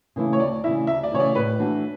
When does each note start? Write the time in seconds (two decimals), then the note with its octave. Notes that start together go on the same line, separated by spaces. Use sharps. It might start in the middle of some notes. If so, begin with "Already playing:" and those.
0.16 C#3 E3 A3 E4
0.33 C#5
0.40 D2 D5
0.64 C#3 E3 A3 E4 E5
0.87 D2 E5
1.03 D5
1.12 C#3 E3 A3 E4 C#5
1.20 D5
1.35 A2 B4
1.59 E3 A3 D4 F#4